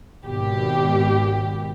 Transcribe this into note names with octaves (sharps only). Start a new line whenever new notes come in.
G#1 B2 G4